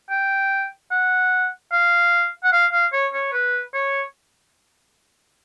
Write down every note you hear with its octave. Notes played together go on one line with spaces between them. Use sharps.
G5
F#5
F5
F#5
F5
F5
C#5
C#5
B4
C#5